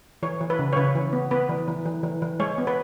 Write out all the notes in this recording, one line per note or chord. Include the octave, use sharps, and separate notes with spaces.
E3 C#5
E3
B4
C#3
C#5
C#3 B4
E3
B3
B3 B4
E3
E3
E3
E3
E3
G#3 C#5
B3
B4